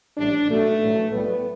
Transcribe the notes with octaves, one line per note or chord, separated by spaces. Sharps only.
A1 A2 G3 D4
B1 B2 F#3 A3
A1 G2 F#3
B1 A2 G3 B3